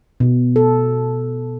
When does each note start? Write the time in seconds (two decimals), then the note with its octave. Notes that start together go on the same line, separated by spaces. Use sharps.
0.20 B2
0.56 A4